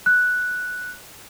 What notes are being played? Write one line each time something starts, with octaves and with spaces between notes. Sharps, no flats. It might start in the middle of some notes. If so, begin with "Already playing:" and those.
F#6